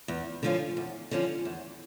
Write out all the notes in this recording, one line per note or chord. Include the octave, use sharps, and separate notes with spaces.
E2
D3 F3 C#4 F4
E2
D3 F3 C#4 F4
E2